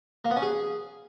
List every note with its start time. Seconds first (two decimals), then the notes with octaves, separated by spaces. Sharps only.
0.25 A#3
0.31 B3
0.36 C#4
0.42 G#4